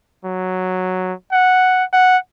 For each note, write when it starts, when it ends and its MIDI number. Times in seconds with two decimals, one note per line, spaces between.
0.25 1.13 54
1.32 1.84 78
1.93 2.17 78